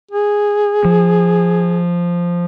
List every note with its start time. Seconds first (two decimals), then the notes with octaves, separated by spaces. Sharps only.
0.11 G#4
0.85 F3